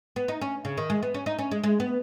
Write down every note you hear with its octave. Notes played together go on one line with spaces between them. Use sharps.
B3
D#4
C#4
C#3
D#3
G#3
B3
C#4
D#4
C#4
G#3
G#3
B3